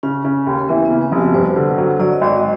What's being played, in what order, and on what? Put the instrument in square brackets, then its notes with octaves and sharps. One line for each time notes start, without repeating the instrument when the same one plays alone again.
[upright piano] C#3 [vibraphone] C#4
[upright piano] C#3
D#2
[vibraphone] A#3
[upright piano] E3 [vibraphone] B3
[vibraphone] B3
[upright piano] C#3
[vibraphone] C4
[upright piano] F1
[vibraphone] F#4
[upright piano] G2 [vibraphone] C5
[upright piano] D3
F#3
[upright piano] F#3 [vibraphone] D5
[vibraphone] D#5
[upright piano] G#1 [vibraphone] D5
[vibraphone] D#5